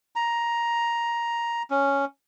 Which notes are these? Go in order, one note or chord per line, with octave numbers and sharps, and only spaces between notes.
A#5
C#4